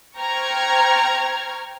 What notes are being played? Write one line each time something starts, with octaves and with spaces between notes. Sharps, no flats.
C5 G5 A#5 C#6 F6 G#6